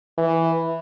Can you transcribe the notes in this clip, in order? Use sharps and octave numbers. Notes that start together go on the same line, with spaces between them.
E3